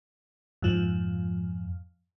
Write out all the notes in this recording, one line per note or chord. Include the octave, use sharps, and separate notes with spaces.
F2 G#2 F3